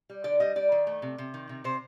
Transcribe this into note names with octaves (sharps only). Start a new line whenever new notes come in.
G3
D3 D5
G3 D#5
G3 D5
D#3
A3
C3
C3
D#3
C3
C3 C5